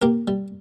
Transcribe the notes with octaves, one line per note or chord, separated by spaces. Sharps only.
A#3 G4 A#4
G3